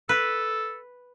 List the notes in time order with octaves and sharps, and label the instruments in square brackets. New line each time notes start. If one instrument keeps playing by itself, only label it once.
[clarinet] A4 [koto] B4